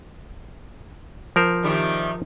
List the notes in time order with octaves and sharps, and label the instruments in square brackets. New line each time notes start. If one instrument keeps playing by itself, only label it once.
[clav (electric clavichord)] F3 A#4 C5
[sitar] C3 D#3 G3